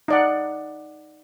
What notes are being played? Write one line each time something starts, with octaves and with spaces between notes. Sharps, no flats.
D#4 D5 F#5